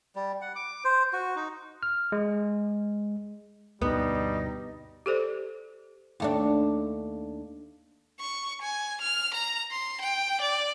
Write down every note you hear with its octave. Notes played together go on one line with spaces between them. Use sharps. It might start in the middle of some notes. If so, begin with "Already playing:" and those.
G3
F#5
D6
C5
F#4
D#4
F6
G#3
D2 G2 B2 G3 B3 D#4
G4 A4 C5 D5
D#2 A3 D4
C#6
G#5
F6
A#5
C6
G5
D5